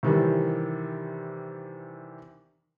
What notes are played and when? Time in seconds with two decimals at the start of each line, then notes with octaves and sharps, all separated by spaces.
0.03 C3 D#3 E3 G3